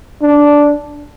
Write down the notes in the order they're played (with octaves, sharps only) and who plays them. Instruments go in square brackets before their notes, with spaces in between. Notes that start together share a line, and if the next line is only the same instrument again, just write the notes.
[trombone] D4